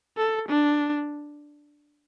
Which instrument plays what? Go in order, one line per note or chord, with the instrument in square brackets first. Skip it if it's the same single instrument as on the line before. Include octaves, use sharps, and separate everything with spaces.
[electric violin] A4
D4